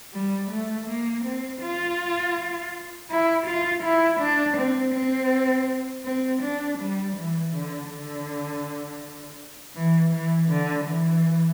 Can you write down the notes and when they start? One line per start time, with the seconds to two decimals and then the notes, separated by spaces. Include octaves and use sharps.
0.13 G3
0.51 A3
0.87 A#3
1.25 C4
1.61 F4
3.10 E4
3.46 F4
3.83 E4
4.20 D4
4.57 C4
4.94 C4
6.05 C4
6.42 D4
6.79 G3
7.16 E3
7.53 D3
7.90 D3
9.75 E3
10.12 E3
10.49 D3
10.86 E3